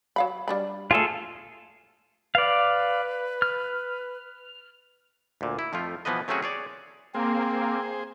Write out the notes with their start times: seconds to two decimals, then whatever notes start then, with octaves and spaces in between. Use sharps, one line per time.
0.16 F#3 F5 B5
0.48 G3 D4 B5
0.91 F3 A3 F4 G#4 A4
2.35 B4 D5 F5
3.42 F6
5.41 D2 A#2
5.59 E4
5.73 F2 F3 A3 F4
6.05 B2 E3 F3 B3 B4 D#5
6.28 F#3 A3 C4 C#4 F#4 G#4
6.42 G#4 C#5 D5
7.15 A#3 C4 G#4 C5